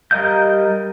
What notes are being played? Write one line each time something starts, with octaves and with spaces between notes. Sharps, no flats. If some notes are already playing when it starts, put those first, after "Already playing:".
G3 A#4 D#5 F5 G6